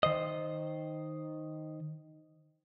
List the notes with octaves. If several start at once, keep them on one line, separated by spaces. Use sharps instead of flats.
D#3 C5 D#5